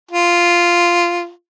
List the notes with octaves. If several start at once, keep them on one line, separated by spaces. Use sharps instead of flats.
F4